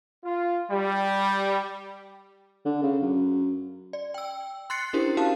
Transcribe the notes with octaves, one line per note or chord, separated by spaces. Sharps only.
F4
G3
D3
C#3
F#2
D5
G5 E6
C6 F#6 A6 C7 C#7
C#4 D4 E4 G4 A#4 C5
F#4 G4 A#4 F5 A5